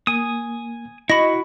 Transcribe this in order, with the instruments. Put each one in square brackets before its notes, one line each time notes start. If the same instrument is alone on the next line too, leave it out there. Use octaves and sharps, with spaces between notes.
[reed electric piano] A#3 [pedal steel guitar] G#5 D#6
[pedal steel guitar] E4 F#4 [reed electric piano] D#5 C#6 [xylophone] B5 A#6